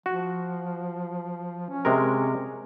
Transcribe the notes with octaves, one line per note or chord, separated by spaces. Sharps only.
F3 F#4
C#4
C3 G#3 A#4